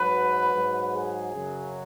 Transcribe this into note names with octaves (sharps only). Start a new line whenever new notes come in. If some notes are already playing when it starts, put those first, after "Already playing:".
Already playing: G#2 F#3 B4
G#2 F#3
G#4
F#2 C#3 F#3